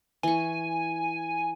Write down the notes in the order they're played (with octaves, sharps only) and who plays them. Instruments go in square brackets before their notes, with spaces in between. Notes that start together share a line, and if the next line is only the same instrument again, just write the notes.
[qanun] E3 C#6 [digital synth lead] G#5